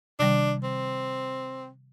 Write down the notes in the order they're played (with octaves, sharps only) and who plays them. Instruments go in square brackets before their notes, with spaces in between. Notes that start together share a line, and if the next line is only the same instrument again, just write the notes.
[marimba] C3 D#3 G3 [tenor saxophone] D4
[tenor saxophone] C4